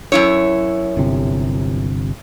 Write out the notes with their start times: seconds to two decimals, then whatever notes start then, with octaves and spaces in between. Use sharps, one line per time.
0.12 F#2 E4 C#5
0.97 G1 C3